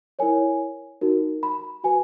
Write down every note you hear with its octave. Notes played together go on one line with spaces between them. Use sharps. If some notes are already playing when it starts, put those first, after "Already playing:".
E4 A#4 C#5 G#5
D#4 F#4 A#4
B5
F#4 B4 G#5